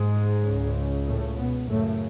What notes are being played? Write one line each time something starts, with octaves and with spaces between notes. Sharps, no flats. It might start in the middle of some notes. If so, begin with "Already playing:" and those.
Already playing: G#2 G#3
C#2 C#3
A2 A3
B2 B3
F#2 A2 C#3 A3